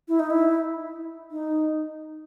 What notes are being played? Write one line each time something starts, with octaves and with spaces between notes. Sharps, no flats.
E4
D#4
E4
D#4